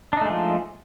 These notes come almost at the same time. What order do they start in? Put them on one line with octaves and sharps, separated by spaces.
D4 D#4 A3 G#3 F3